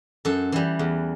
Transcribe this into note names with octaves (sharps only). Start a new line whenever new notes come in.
F#2 A4
E3 G3
E2